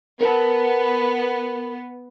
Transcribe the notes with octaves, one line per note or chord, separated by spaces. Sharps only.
B3 A#4 A5